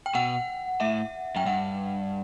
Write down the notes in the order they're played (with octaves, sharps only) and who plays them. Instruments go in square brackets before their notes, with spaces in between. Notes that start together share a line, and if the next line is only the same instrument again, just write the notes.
[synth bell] G5
[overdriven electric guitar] B2 [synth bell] F#5
[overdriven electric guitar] A2 [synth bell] E5
[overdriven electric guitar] F#2 [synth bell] G5
[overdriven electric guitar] G2 [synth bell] F#5